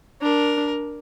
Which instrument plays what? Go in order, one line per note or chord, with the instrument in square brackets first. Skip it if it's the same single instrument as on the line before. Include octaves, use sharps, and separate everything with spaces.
[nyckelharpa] D4 [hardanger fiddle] A#4